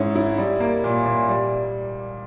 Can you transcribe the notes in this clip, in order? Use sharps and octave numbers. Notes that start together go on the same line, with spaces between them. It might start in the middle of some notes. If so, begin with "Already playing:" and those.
Already playing: G#2 C#4 E4
E4
G3
A#3
A#2
A#2
G3